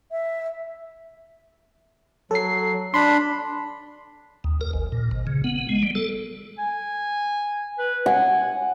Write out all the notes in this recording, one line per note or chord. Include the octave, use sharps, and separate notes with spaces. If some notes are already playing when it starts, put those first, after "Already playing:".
E5
F#3 A4 C7
D4 B5 C6
D#2
A#4
G#1
A#2
G#1
C#3
B3
G#3
G3
A4
G#5
B4
F#5 G#5